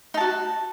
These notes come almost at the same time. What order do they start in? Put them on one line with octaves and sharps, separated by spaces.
D#4 A5 F#4